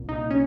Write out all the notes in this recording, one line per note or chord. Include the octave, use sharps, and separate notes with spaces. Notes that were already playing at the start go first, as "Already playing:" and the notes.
Already playing: C2 A#2
D#4
C#4